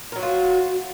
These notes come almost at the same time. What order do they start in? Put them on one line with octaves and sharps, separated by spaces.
A#4 F#3 F#4 F4